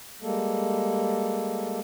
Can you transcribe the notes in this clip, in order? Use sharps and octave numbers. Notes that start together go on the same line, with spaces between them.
G3 G#3 A#3 A4